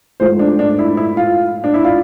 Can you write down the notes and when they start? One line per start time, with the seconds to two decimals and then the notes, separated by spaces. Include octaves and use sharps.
0.20 G#2 F3 A3 C5
0.39 D4
0.59 D4
0.79 E4
0.97 E4
1.17 F4
1.64 D4
1.74 E4
1.84 F4